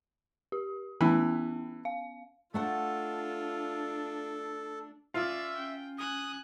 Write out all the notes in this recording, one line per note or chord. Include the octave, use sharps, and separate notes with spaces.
G4
E3 B3 C#4 B5
F5
A3 D4 F4 A4 F#5 A5
C#4 F4 D5 E5
C#4 G5
G#5 D#6 F#6